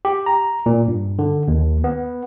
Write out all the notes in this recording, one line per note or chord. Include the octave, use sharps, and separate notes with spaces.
G4
A#5
A#2
G2
D3
D#2
B3